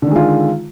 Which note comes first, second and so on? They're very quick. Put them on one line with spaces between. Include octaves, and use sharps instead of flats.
D3 D#3 G#3 F4